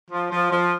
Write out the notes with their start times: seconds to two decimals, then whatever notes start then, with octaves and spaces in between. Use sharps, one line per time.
0.11 F3
0.31 F3
0.51 F3